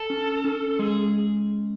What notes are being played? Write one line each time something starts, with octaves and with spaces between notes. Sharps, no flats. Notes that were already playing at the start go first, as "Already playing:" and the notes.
Already playing: A4
C#4
C#4
G#3 G#4